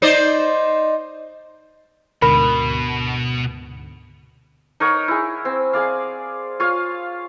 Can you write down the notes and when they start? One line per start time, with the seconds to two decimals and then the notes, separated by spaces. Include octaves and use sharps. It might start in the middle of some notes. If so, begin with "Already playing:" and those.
0.02 D#4 C5 D5
2.22 D2 G#2 B2 D3 A#4 B5
4.80 D#4 A#4 C#5 F#5
5.08 E4 G#4
5.45 C4
5.73 G#4 D5 F5
6.60 F4 C#5 F5